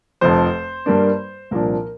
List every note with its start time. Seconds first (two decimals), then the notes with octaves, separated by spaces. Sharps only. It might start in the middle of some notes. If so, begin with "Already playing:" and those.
0.21 F1 F2 F3 C5
0.86 G2 G3 A#3 D4
1.51 C2 A#2 F3 A#3 D4 A#4